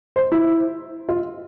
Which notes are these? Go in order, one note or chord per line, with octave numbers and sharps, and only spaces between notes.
C5
E4
F4